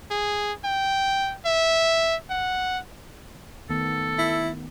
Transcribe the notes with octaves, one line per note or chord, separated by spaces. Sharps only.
G#4
G5
E5
F#5
D#3 A3 B3 A4
E4